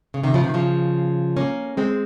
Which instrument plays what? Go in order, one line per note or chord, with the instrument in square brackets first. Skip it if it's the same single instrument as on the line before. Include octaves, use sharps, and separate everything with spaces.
[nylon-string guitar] C#3
C3 D#3
C#3 F3
C3 D#3
C#3 F3
A#3 C#4
G#3 C4